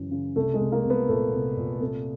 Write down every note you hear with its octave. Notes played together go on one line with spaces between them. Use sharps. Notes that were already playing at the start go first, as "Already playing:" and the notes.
Already playing: F#2 C#3 E3
C#3
C2 A3
G#3
C2
A#3
C2
B3
A#2 A3
C2
A#2
C3 A3